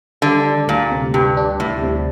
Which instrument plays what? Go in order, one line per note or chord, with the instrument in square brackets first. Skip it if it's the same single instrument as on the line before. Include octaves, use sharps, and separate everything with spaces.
[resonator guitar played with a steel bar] D3 [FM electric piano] G3
[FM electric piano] D4
[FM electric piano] D2 [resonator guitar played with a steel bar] A#2
[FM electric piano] C3
[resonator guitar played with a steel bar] G2 [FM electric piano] G3
[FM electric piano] D4
[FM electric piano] D2 [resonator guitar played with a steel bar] A2
[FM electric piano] C3